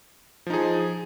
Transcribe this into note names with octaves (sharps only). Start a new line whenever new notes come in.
F3 D#4 G#4